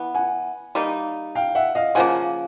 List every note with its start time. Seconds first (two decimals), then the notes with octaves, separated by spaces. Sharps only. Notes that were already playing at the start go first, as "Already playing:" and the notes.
Already playing: E3 B3
0.15 F#5 G#5
0.75 G3 A#3 D#4
1.35 F5 G5
1.55 E5 F#5
1.75 D#5 F5
1.95 C#3 F3 A#3 F#5 G#5